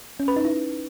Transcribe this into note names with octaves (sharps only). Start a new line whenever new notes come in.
C#4
B4
D#4
E4